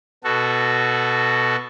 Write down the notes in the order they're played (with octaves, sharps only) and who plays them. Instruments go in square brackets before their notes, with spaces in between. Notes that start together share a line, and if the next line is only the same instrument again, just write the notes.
[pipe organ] B2 F#4 A4